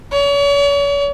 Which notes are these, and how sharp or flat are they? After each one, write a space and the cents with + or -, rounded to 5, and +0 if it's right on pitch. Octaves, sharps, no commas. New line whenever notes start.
C#5 +40